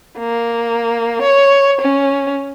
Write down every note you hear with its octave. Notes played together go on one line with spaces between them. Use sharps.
A#3
C#5
C#4